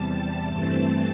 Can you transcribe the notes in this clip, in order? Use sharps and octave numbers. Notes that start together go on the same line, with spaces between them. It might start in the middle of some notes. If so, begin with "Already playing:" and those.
Already playing: E2 C3 G3 A5
G2 E3 A3 C4